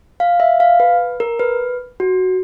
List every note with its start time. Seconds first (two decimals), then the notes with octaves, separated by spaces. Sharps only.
0.20 F5
0.40 E5
0.60 F5
0.80 B4
1.20 A#4
1.39 B4
2.00 F#4